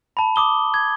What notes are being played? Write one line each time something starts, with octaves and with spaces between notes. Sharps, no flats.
A5 B5
D6 D#6 G7
G#6